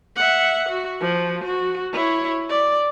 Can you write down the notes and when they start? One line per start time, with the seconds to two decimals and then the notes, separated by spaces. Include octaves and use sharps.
0.16 E5 F#5
0.69 F#4
1.00 F3
1.44 F#4
1.92 E4 C#5
2.49 D5